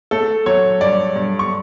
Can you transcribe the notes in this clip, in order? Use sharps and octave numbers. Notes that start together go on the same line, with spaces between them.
A3 A4
F#3 C#5
G2 D5
G2
C#6